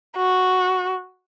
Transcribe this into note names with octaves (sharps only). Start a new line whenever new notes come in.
F#4